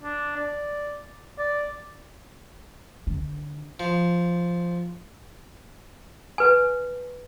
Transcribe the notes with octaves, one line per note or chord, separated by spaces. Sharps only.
D4
D5
D5
D3
F3
B4 G#5